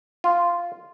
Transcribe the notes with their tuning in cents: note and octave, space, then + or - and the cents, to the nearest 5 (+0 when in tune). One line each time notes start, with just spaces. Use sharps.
F4 -5